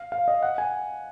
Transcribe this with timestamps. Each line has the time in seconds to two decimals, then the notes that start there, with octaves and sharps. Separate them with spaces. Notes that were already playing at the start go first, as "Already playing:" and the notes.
Already playing: F5
0.12 F5
0.28 D#5
0.43 F#5
0.58 G#5